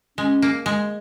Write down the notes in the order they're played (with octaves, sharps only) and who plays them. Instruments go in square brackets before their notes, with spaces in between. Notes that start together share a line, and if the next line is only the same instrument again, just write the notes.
[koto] G#3 [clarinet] C#4
[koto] A#3
G#3